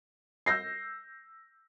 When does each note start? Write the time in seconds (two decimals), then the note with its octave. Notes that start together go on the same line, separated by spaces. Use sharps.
0.46 E6 G6 A#6 C7